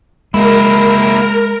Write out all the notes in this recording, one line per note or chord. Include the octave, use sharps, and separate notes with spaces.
G#3 A#3 E4 A#4